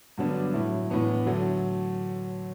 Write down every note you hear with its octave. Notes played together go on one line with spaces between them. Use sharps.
G2 D3 F#3 B3 D4
A2 F#3 A3 E4
A2 E3 B3 D4
D3 F#3 A3